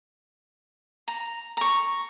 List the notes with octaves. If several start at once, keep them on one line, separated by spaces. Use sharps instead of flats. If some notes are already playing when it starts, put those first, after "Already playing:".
A#5
A#5 C#6